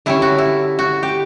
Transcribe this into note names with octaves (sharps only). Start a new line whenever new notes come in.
D3 G3 C#4 E4
F#4
E4
F#4
G4